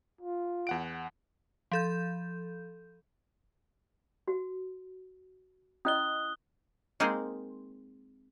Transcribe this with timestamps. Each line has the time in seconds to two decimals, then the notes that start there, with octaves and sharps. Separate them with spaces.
0.21 F4
0.67 E2 F#5 D7
1.72 F3 A4 G6
4.28 F#4
5.85 C#4 E4 D#5 D#6 F#6 G7
7.00 G#3 A#3 C4 D#4 G#4 C5